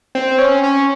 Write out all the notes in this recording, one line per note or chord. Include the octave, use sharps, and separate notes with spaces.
C4
C#4
C#4